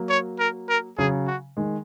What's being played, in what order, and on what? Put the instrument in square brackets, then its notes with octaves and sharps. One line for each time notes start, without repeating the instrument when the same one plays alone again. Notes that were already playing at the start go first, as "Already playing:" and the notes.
Already playing: [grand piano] F#3 A#3
[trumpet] C#5
A#4
A#4
[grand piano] C#3 F#3 [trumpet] G#4
[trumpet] F#4
[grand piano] D#3 G#3